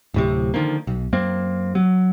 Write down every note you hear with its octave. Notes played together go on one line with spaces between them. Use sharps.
D1 A2 C3
D3 D#3 F3 A#3
B1
F#2 A#3 C4
F#3